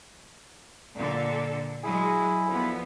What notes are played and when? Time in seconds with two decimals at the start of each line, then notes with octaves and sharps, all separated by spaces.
0.96 A#2 D3 D4 A4
1.84 F#3 G#3 E4 G#4
2.48 D2 F3 B3